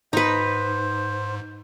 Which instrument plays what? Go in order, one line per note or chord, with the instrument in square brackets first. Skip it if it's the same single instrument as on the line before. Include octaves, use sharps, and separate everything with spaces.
[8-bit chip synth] G#2 [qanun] D#4 B4 [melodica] C5